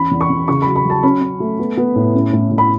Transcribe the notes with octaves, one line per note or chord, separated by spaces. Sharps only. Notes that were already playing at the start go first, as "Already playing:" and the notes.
Already playing: E2 C#4 B5
E2
C#6
E2
C#3 C#6
F#3 B5
B5
F#3 A5
C#4 B5
C#4
A3
B3
B3
A2
C#4
A2
A2
B5